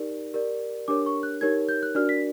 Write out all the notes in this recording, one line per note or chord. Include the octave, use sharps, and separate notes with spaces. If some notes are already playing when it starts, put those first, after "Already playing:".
Already playing: D#4 G4 A#4 D5
G4 A#4 D5
D4 G4 A#4 C#5 D6
C#6
F#6
D#4 G4 A#4 C#5 G#6
G6
F#6
D4 F#4 A#4 D5 F6
B6